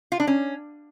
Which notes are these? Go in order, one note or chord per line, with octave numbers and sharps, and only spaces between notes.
F4
D4
C#4